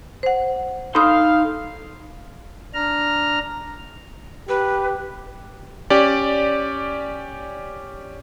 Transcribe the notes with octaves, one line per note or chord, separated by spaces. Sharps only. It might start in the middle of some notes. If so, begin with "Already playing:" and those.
C5 F#5
D#4 A4 F5 B5 C6 D#6
D4 A#5 F6
G4 B4
C#4 G4 D5